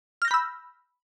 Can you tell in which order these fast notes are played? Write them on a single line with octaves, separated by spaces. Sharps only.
F6 A#6 G6 B5 E6